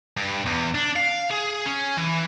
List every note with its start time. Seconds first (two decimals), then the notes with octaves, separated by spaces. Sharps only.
0.17 G2
0.46 E2
0.75 D4
0.96 F5
1.31 G#4
1.66 C#4
1.97 E3